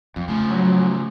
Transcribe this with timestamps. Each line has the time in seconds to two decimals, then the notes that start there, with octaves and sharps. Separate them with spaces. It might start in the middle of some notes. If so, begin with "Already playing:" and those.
0.16 F2 F3
0.28 C#3 F3 A3
0.50 F#3